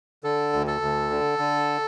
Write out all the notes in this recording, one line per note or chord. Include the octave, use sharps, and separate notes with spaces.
D3 A4
D2
A4
D2
D3
D3